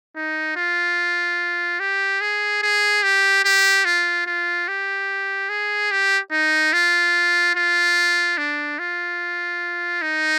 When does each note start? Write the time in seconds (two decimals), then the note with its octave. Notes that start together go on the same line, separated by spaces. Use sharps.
0.16 D#4
0.56 F4
1.80 G4
2.21 G#4
2.62 G#4
3.03 G4
3.45 G4
3.85 F4
4.26 F4
4.68 G4
5.49 G#4
5.91 G4
6.32 D#4
6.73 F4
7.55 F4
8.38 D4
8.79 F4
10.02 D#4